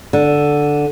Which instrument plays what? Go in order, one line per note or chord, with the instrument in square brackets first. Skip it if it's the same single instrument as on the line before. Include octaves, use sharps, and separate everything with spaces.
[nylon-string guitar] D3